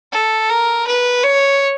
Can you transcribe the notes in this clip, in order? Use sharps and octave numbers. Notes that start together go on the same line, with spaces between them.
A4
A#4
B4
C#5